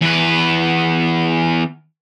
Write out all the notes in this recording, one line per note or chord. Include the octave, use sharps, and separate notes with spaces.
E2 B4